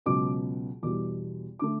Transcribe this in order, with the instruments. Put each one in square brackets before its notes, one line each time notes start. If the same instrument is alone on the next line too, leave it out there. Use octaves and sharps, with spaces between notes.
[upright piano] C#2 B2 F#3 D6
E2 B2 G3 D6
D3 A3 D6